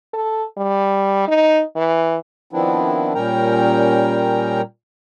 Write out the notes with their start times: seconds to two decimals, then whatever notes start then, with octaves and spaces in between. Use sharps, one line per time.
0.13 A4
0.57 G3
1.28 D#4
1.76 E3
2.53 D#3 F3 B3 C4 D4 E4
3.15 A#2 G3 C#4 A#4 G5 A#5